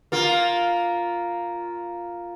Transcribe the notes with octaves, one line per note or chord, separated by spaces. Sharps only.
A#3 F4